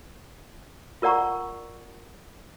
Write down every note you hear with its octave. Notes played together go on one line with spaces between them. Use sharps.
F4 A#4 D5 F#5 A#5 C#6